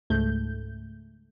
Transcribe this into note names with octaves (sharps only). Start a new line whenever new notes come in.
C#2 G#2 A3 G6